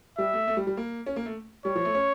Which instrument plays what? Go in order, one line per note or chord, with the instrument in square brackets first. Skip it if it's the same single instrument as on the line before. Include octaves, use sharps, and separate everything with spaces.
[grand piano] G3 [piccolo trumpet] E5
[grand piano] A3
A3
G3
G3
A#3
C#4
A#3
A3
[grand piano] G3 [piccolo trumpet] C#5
[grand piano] F3
A3
C#4